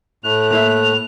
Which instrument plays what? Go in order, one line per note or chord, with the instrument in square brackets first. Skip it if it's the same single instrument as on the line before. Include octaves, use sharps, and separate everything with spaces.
[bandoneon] A2 A3 F#6 [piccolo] F7
[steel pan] A#3 E4 E5 [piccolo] F7